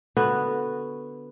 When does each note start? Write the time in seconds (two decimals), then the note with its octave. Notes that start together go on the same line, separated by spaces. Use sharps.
0.17 D3 B3 F#4 B4